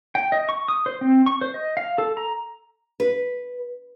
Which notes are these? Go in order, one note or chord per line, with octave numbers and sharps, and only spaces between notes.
G5
D#5
C#6
D#6
C5
C4
C#6
C5
D#5
F5
A4
A#5
B4